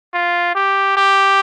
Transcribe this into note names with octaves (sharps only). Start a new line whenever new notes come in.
F4
G4
G4